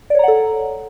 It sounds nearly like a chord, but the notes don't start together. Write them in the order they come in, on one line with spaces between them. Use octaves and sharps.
D5 C#5 A#5 F#5 A4